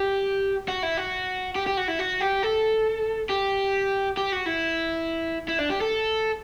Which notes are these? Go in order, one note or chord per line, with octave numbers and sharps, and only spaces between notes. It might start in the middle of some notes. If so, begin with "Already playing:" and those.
Already playing: G4
F#4
E4
F#4
G4
G4
F#4
E4
F#4
G4
A4
G4
G4
F#4
E4
E4
D4
G4
A4